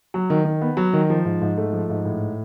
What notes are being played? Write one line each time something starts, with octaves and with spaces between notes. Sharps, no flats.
F#3
D#3
D#3
B3
F#3
D#3
F3
G#2
G#2
A3
F3
G#2
A2